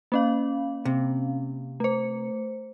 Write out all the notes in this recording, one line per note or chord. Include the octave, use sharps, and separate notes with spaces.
A#3 C#4 F5
C3
A3 C5